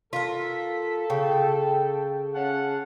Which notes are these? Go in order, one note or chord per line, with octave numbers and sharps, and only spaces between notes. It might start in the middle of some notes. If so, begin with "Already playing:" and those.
F4 A4 A#4 B6
C#3 G5
C#4 F5 F#5 A5